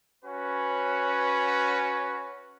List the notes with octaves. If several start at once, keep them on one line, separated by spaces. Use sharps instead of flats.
C#4 F#4 B4